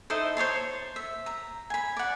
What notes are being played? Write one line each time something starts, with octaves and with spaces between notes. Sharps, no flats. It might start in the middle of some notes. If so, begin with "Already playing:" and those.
D#4 E4 A4 C5
C5 C#5 A5 C6
E5
A#5
G#5 B5
D5 F#5